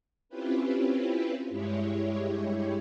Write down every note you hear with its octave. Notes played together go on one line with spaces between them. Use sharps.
C4 C#4 E4 F4 G4 B4
G2 G#3 E4 G4 C#5